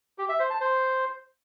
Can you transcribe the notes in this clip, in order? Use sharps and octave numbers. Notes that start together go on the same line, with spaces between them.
G4
E5
C5
A5
C5